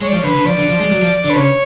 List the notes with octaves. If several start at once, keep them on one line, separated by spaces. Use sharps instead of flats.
G#3 C#5
D5
F3
C#5
D3 B4
D3
F3 D5
D3
F3
G#3
F#3
F3
D3
B4
C#3 C#5